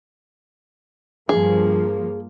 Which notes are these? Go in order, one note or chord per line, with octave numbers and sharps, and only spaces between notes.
G2 F3 A#3 G#4